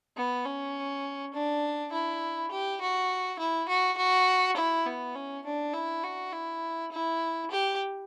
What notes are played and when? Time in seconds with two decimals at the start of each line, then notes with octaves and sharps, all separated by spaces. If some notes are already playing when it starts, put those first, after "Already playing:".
0.17 B3
0.45 C#4
1.34 D4
1.92 E4
2.51 G4
2.81 F#4
3.39 E4
3.69 F#4
3.97 F#4
4.57 E4
4.86 B3
5.15 C#4
5.45 D4
5.74 E4
6.03 F#4
6.33 E4
6.91 E4
7.51 G4